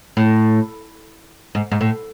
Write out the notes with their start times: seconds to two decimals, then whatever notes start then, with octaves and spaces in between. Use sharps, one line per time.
0.17 A2
1.55 G#2
1.72 G#2
1.81 A2